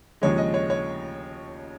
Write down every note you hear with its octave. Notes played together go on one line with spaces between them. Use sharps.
D#2 C#3 F3 G#3 C#5
D#5
C#5
C#5